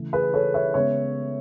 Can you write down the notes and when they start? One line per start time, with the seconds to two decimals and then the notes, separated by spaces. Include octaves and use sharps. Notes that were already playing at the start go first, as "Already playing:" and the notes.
Already playing: C#3 E3 A3
0.13 G#4 B4
0.34 A4 C#5
0.54 C#5 E5
0.74 C#3 G#3 B3 C#5 E5